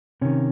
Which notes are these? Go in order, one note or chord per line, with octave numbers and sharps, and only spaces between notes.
C3 D#3 C#4